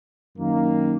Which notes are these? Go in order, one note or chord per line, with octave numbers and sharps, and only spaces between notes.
F#2 D#3 A#3